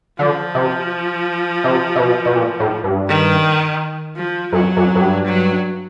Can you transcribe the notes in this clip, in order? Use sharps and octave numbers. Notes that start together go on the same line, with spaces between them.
D3 F3
C3
C3
C3
B2
B2
A#2
A2
G2
D#3
F3
F#2 F#3
F#2
F#2
G2
F#3